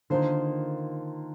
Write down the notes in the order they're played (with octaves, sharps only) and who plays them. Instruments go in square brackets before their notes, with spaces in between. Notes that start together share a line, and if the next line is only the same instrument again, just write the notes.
[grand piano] D3 [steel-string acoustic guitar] D#3 A#3 F4 C5